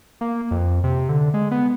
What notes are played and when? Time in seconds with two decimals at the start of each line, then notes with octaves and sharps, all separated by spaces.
0.21 A#3
0.51 F2
0.84 C3
1.09 D3
1.34 G#3
1.51 B3